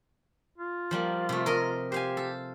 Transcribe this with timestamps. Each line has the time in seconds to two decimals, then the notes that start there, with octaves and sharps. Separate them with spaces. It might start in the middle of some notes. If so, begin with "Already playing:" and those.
0.58 F4
0.91 F3 G3 A#3
1.29 C3 A3
1.46 A#4 D#5
1.92 G4 C5 F5 G#5
2.17 A4